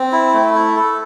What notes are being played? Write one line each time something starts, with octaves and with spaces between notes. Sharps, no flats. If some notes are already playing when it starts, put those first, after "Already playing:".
Already playing: C4
E4
A3
E4
A4